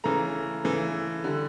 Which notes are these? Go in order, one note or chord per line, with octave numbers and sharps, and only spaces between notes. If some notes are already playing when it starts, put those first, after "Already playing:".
C#3 E3 A3 A#5
C#3 E3 A3
D3 G3